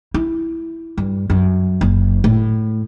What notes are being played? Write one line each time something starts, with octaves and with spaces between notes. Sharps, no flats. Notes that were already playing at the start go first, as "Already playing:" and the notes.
E4
G2
F#2
F#1
A2